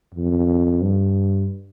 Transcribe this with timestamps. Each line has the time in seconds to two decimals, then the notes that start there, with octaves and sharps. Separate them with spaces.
0.14 F2
0.82 G2